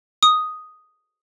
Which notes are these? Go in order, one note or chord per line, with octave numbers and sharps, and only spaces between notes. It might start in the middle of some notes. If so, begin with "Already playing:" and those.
D#6